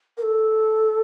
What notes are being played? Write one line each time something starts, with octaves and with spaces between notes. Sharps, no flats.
A#4
A4